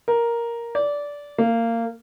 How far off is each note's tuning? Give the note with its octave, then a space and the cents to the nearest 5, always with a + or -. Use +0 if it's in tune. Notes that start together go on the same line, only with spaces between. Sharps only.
A#4 +5
D5 -15
A#3 -20